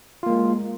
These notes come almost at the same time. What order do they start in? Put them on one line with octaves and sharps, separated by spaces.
F4 A#3 G#3